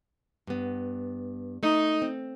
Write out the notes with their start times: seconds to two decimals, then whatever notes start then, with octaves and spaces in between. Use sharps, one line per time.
0.47 G2 B3
1.63 A3 D#4
2.02 C4